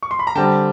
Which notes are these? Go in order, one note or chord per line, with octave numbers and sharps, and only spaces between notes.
C#6
C6
B5
A#5
D3 G3 C4 G5 A5